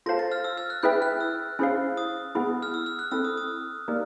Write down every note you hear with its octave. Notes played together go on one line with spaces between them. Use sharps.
F4 A4 C5 F5 A5 A#6
A6
F6
E6
F6
F#6
E4 G#4 B4 E5 G5 G6
F#6
E6
C#4 E4 G#4 C5 F5
D#6
B3 E4 G#4
F6
E6
F6
F#6
C4 E4 A4 E6
D#6
D#6
A#3 D#4 G4 A#4 D5